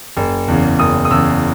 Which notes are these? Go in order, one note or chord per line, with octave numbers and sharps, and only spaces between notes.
F#1
E2 C#3
F#1 D#6
D#6
E2 C#3 E6